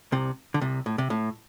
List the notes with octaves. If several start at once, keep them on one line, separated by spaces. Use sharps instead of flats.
C2 C3
D3
C2 C3
A2
C3
A2